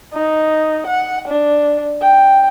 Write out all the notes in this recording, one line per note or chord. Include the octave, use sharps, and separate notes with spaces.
D#4
F#5
D4
G5